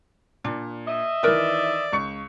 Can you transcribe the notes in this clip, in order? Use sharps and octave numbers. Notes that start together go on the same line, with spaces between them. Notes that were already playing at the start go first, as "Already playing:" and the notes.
A#2 D4
D#5 E5
D#3 E3 A#4 B4 D5
C#2 C#6 C#7